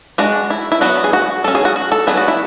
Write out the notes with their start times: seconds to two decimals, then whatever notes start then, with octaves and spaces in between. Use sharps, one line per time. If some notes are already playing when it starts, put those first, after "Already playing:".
0.18 G#3 D4 F#4
0.50 E4
0.72 E4
0.81 F#3 B3 D4 F#4
1.04 G#4
1.13 F#4
1.44 F#3 C#4 A4
1.55 G#4
1.65 F#4
1.76 F#4
1.92 A4
2.07 F#3 B3 D4 G#4
2.17 F#4
2.28 E4